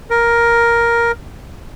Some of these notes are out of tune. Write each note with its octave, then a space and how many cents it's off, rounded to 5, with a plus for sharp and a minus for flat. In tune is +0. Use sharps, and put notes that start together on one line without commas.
A#4 +5